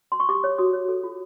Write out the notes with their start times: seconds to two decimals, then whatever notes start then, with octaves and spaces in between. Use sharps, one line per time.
0.12 C6
0.20 C#6
0.29 G4 D6
0.44 C#5
0.58 F#4 D#6
0.73 C#5
0.89 A4
1.03 F4